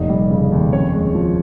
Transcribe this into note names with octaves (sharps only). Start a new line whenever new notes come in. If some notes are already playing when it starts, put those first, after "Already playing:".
Already playing: F1 A#2 D#4 D#5
G3
C#3
D#2
F2 C#4 C#5
G#3
F3